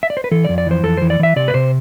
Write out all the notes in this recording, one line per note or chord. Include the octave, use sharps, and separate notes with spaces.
E5
D5
C5
B4
E3 A4
D5
F2
D5
E3 C5
F2 A4
E3 C5
D5
E3 E5
C3 D5
B4
C3 C5